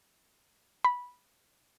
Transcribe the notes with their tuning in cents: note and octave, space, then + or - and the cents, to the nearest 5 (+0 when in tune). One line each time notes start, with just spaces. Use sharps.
B5 -10